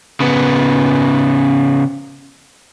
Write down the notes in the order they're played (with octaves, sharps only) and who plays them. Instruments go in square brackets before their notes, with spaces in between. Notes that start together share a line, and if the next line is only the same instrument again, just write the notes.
[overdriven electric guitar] C#3 B3